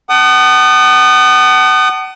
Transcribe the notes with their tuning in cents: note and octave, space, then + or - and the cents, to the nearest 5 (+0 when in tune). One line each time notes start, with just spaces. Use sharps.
F#5 +35 A5 +0 D#6 -25